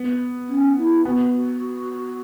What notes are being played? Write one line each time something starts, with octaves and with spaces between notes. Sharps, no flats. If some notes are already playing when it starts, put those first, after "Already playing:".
Already playing: B3
C#4
E4
B3 F#4
F#4